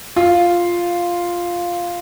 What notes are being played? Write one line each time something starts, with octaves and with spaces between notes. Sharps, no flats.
F4